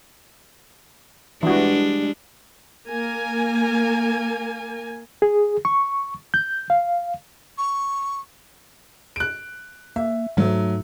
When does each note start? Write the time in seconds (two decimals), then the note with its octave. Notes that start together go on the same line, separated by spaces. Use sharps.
1.43 E3 G3 G#3 D4 F#4
2.89 A#3 A#4 G#5
5.22 G#4
5.65 C#6
6.34 G6
6.70 F5
7.57 C#6
9.16 F#6 D7
9.96 A#3 E5
10.37 G#2 F#3 A3